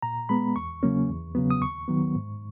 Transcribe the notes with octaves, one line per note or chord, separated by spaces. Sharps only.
A#2 A#5
G#3 B3 B5
E2 C#6
C#3 F#3 A#3 C#4
E2
C#3 F#3 B3
D#6
D#2 C#6
D#3 F#3 B3
G#2